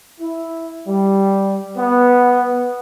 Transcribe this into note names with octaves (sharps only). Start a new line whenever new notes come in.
E4
G3
B3